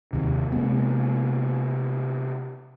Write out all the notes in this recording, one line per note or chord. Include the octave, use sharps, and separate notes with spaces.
D#2 C3
C3 G#3 A#3 B3